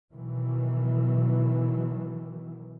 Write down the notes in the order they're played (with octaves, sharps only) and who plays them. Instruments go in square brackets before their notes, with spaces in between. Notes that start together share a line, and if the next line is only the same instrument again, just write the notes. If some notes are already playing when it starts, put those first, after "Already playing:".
[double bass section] B2 D#3 E3 F#3